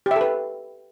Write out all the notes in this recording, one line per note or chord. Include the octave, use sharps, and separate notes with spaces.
G4 A4 B4 E5